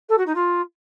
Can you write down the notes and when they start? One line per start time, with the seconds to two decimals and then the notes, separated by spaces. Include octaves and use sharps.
0.09 A4
0.18 F#4
0.26 D#4
0.35 F4